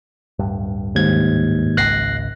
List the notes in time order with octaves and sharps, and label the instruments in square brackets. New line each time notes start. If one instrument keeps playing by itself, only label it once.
[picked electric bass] D1 G2
[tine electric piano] D#2 G#2 G#6
[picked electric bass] G#1 C#2 [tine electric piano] F#6 A#6 C7